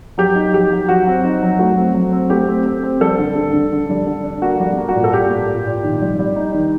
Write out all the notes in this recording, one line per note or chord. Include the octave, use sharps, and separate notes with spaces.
F#3 G4
D#4
F#3 G4
F#3
F#3 F#4
C4
D#4
F#3
A3 F#4
C4
F#3
C4
A3 G4
C4
C4
C4
G3 A4
D3
D3
D3
D3
G3
D3
D4
A#3 F#4
G3
A#3
F#4
A#2
A4
A#2 G4
A#3
A#2
A#2
D#3
G3
G3
D#4
D#3